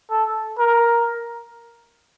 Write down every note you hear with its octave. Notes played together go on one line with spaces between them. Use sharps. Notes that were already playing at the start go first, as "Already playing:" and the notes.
A4
A#4